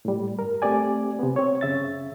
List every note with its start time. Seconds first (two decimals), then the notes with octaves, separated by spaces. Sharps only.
0.05 A2 G3
0.39 G2 A#4
0.62 A3 C4 G4 D5 G#5
1.19 C3 B3
1.36 C4 C#5
1.61 F#2 C#3 E5 A6